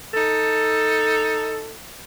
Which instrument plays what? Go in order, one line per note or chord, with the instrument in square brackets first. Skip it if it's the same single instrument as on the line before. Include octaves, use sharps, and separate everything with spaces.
[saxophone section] D#4 A4